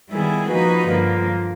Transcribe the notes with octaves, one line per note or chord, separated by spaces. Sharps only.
D#3 G3 B3 E4 G#4
F3 A#3 D#4 F#4 B4
G2 D3 F3 A#3